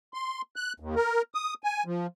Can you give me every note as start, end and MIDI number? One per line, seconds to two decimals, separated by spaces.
0.14 0.41 84
0.56 0.73 90
0.80 0.95 39
0.95 1.22 70
1.34 1.54 87
1.64 1.84 80
1.86 2.07 53